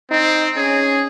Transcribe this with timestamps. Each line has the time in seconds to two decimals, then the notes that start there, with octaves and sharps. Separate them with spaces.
0.11 C4 D#4
0.57 C#4 G#4